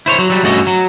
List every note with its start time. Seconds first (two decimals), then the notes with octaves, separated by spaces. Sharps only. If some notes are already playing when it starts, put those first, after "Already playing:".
0.06 E4 C5 C#5
0.18 F#3
0.30 F#3 G3
0.44 G2 A3 C#4 F#4 D#5
0.67 F#3